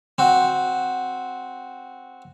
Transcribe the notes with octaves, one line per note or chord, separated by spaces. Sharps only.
C4 F#4